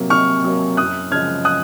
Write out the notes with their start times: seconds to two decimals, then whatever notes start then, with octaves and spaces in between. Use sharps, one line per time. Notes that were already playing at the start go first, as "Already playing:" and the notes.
Already playing: C3 F#3 A#3
0.10 C3 C#6 F6
0.44 F#3 A#3
0.77 F#2 D#6 F#6
1.11 C#3 F3 G#3 F6 G#6
1.45 D#6 F#6